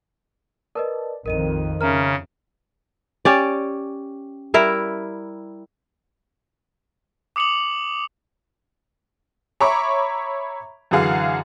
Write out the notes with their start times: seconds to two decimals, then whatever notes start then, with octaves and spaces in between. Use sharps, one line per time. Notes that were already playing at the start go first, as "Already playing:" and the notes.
0.75 A#4 B4 D5 D#5 A5
1.26 A#1 F2 D#3 A#4 D#5 D#7
1.81 C#3 C#4 A#4 E5 A#5 F6
3.25 C#4 G4 D5
4.54 G3 E4 A#4 E5
7.36 D6 D#6 C#7 F7 F#7
9.60 C#5 E5 A#5 B5 C#6 D6
10.91 F#2 D3 E3 G#4 F5 F#5